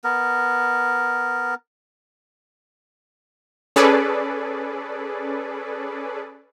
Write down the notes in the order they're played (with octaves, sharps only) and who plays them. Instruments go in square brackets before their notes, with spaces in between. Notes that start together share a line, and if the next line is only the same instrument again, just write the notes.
[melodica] B3 A#4
[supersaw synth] C#4 G#4 A4 B4 D5